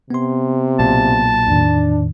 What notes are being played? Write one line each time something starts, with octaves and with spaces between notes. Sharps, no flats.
C3 B3 C6
B1 A#2 A5
E2 A2 D#3 D4